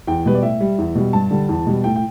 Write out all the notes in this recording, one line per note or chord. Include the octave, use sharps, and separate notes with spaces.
E2 G5
B2 G3 B4
D5
A2 E5
G3
E2
B2 G3
G2 A5
D3 G3
E2
B2 G3
A2 G5
G5